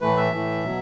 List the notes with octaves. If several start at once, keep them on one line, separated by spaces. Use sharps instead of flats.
A2 E3 A3 B4
E5
A2 E3 A3
B2 F#3